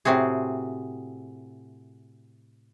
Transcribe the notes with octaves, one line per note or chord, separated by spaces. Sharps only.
A2 C3 C4 F#4 G#4